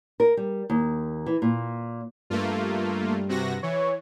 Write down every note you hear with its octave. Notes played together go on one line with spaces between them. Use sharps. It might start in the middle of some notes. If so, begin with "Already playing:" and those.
A#4
G3
D#2
E3
A#2
G2 A3 A#3 F4
C3 F#4 A#6
E3 C#5